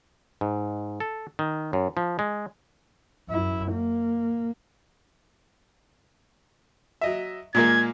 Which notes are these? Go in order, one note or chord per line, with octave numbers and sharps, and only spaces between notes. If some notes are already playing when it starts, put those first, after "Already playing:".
G#2
A4
D#3
F#2
F3
G#3
F#2 E4
A#3
F#3 D#5 E5
A#2 G#3 A#3 G#6